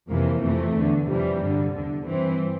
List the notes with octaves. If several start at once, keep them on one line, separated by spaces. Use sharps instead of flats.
F2 C3 E3 A#3
F2 C3 E3 A3
E2 D3
F2 C3 E3 G3
G2 D3
E2 D3
G2 E3 C4